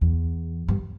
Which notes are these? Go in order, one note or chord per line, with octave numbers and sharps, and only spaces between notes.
E2
G2